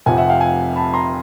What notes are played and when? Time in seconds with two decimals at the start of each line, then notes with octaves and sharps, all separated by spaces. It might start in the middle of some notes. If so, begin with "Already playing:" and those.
0.06 F1 F2 C3 F3 F#5 G#5
0.17 E5 F#5
0.29 F5 G5
0.41 F#5 G#5
0.76 A5 B5
0.94 A#5 C6